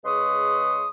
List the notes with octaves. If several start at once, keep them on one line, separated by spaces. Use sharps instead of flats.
C#3 G#3 B4 C6 C#6 D#6